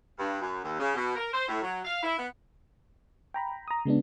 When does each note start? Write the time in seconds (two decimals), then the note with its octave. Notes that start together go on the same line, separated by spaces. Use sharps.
0.19 G2
0.41 F#2
0.63 D#2
0.80 C#3
0.95 B2
1.16 A#4
1.34 C5
1.48 A2
1.62 F#3
1.85 F5
2.03 E4
2.18 B3
3.34 G5 A#5 B5
3.68 A#5 D#6
3.85 C#3 G#3 B3 D4